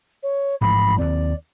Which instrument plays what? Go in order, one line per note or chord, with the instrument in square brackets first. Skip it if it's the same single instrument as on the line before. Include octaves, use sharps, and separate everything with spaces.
[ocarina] C#5
[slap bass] A1 G#2 F3 [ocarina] B5
[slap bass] D#2 C4 [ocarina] D5